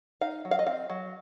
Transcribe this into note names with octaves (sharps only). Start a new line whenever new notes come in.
D#4 F5
F#3
F5
D#5
C4 F5
F#3